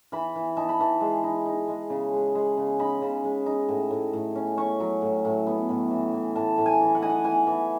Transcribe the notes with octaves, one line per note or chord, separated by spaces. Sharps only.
E3 B5
E3
D#4 A5
B5
E3 A5
G#3
D#4
D#4
G#3
C#3
G#3
G#3
C#3
D#4 B5
C#3
G#3
D#4
A2
A2
A2
C#4
C#4 C#6
F#3
A2
A2
B3
A2
E3
E3
A2 A5
A2
G#5
E3
F#5
D#4 G#5
F#5
E3 G#5
E3